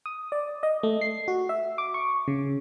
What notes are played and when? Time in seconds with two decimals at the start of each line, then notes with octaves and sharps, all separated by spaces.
0.06 D#6
0.32 D5
0.63 D#5
0.83 A3
1.01 C7
1.28 F#4
1.49 E5
1.78 D6
1.94 C#6
2.28 C#3